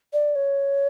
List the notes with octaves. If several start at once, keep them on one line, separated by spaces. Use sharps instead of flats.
D5
C#5